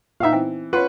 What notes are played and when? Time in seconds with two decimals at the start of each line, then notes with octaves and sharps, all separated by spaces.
0.20 A#2 B3 D#4 E5 F5
0.33 E3 C4
0.73 C#4 F4 B4 F#5 C6